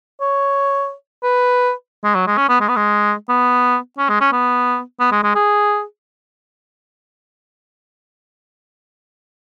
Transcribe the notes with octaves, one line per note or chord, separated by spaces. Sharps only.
C#5
B4
G#3
F#3
G#3
C#4
B3
G#3
B3
G#3
B3
C#4
G#3
C#4
B3
B3
G#3
G#3
G#4